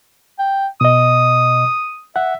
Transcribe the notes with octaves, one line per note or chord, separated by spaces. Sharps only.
G5
B2 D#5 D#6
E5 F#5